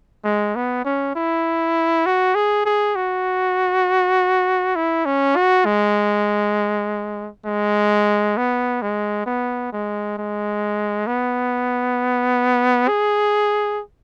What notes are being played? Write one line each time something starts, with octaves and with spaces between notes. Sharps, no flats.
G#3
B3
C#4
E4
F#4
G#4
G#4
F#4
E4
C#4
F#4
G#3
G#3
B3
G#3
B3
G#3
G#3
B3
G#4